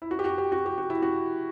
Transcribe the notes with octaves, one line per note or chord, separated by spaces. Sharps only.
E4
F#4
G4
F#4
G4
F#4
G4
F#4
E4
F#4